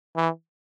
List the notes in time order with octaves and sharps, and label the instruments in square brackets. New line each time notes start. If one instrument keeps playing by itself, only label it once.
[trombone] E3